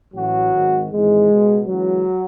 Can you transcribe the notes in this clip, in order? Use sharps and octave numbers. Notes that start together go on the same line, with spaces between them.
A1 A2 E3 F#3 F#4
G#1 G#2 D#3
G#1 G#2 E3 G#3
C#2 B2
C#2 C#3 E3 F#3